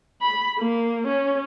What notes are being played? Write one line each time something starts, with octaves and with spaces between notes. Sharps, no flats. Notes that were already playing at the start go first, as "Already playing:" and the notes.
B5
A#3
C#4